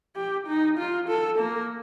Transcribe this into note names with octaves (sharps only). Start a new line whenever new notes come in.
G4
D#4
F4
A4
A#3